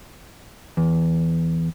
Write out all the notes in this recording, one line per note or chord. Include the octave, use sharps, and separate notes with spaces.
E2